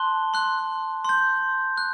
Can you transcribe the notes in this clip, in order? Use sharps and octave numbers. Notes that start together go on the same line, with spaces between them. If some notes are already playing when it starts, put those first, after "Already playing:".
Already playing: A5 C6 F#6 G7
C6 F#6
C6 G6
F#6